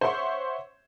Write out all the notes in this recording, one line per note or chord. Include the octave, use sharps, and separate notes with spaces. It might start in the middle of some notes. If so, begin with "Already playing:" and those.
C5 C#5 E5 F#5 C6 C#6